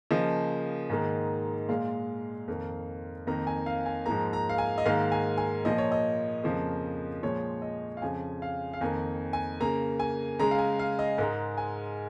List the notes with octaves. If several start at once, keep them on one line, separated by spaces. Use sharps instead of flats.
C#3 F3 A#3 D#5
G#2 D#3 A#3
A#2 G#3 F5
F2 D#3 A#3
F2 D#3 A#3 A#5
G#5
F5
G#5
G#2 F3 A#3 A#5
A#5
F5
G#5
D#5
G#2 D#3 A#3 F5
G#5
G#5
A#2 F3 A#3 D#5
C#5
D#5
F2 C#3 F3 A#3
A#2 F3 G#3 C#5
D#5
F5
F2 C#3 F3 G#5
F5
F5
F2 D#3 A#3 G#5
G#5
C#3 A#3 A#5
G#5
C#3 G#3 A#5
F5
G#5
F5
D#5
G#2 G#3 A#4
G#5